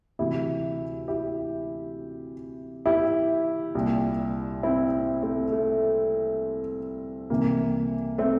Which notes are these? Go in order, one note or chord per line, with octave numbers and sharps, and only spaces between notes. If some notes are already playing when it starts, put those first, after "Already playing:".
D2 C3 E3 E4 G4
E4 G4
E4 G4
C2 A#2
C4 E4
A3 C4
A3
C2 C3 E3 A#3
A3 C4